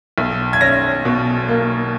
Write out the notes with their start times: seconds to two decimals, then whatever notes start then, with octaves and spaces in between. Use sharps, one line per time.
0.18 B1
0.53 G#6
0.61 C#4 A#6
1.05 B2
1.49 A#3